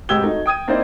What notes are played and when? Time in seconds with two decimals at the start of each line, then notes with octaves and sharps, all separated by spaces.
0.09 F1 G#2 G4 E6 G#6 G7
0.24 A3 D#4 F#4
0.46 G5 D#6 G#6 D#7
0.68 A#3 C4 D#4 E4 C5 D5